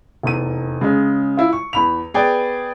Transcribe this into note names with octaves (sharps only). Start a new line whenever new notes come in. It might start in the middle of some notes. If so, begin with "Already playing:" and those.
F1 E2 D#7
C#3 G#3
E4 F4
C#6
E2 B5 F7
B3 G#4 B4 D5 G5